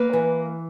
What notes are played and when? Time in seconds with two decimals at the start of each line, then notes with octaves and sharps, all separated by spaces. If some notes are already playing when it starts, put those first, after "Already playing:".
Already playing: A#3 B4
0.13 E3